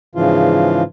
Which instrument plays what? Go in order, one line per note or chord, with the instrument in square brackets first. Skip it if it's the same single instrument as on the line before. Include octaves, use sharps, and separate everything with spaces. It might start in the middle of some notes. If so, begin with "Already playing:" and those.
[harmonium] G#2 C#3 E3 F3 F4